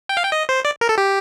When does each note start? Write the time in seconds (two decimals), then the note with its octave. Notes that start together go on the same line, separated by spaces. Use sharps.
0.09 G5
0.17 F5
0.25 G5
0.32 D#5
0.49 C5
0.65 D5
0.81 A#4
0.89 A4
0.98 G4